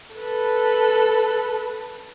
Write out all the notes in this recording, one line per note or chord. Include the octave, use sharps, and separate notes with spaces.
A4 B4